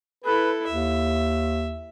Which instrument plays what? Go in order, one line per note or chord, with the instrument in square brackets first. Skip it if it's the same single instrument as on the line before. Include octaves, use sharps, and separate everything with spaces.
[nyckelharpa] E4 A4 [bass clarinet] B4
[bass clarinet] D#2 [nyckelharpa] E5